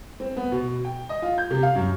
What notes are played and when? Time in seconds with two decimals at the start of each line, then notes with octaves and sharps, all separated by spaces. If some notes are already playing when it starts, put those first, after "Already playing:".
0.20 C4
0.37 B3
0.52 B2
0.85 G5
1.09 D#5
1.22 F4
1.38 G6
1.51 C3
1.63 F5
1.75 F#2